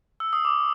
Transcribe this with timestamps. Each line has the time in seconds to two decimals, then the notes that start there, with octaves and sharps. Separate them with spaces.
0.20 E6
0.33 D#6
0.45 D6